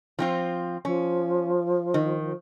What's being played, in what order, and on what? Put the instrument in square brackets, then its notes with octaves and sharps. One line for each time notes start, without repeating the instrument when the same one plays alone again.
[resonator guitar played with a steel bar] F3 C4 F4
[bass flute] F3 [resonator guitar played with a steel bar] C#4
[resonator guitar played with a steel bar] D#3